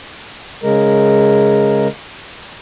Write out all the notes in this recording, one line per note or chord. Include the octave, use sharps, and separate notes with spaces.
C#3 G#3 A#4